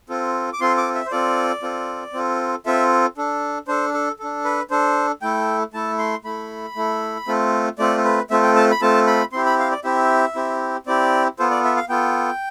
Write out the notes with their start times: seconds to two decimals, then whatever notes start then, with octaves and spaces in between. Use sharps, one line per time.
0.09 C4 F4 A4
0.53 D6
0.61 C4 F4 A4 C6
0.77 D6
0.95 E5
1.06 C5
1.11 C4 F4 A4 D5
1.63 C4 F4 A4
2.14 C4 F4 A4
2.66 C4 F4 A4 E5
3.17 D4 A4
3.68 D4 A4 C5
3.94 A4
4.19 D4 A4
4.45 B4
4.71 D4 A4 C5
5.22 A3 E4 A4 G5
5.74 A3 E4 A4 A5
5.99 C6
6.25 A3 E4 A4 B5
6.76 A3 E4 A4
7.27 A3 C4 F4 A4
7.78 A3 C4 F4 A4 D5
7.98 A4
8.04 B4
8.30 A3 C4 F4 A4 E5
8.43 G5
8.56 A5
8.71 B5
8.82 A3 C4 F4 A4 A5
9.07 B5
9.32 C4 E4 G4 C6
9.46 B5
9.59 F5
9.71 D5
9.84 C4 E4 G4 E5
10.35 C4 E4 G4
10.87 C4 E4 G4 D5
11.39 B3 F4 A4 C5
11.51 D5
11.64 E5
11.76 F5
11.89 B3 F4 A4 G5